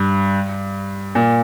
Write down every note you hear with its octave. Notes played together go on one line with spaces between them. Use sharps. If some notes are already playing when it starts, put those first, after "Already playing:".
Already playing: G2
A#2